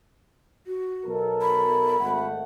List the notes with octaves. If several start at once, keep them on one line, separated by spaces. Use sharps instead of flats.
F#4
B1 A4 A#4
B5
G#1 A3 F#5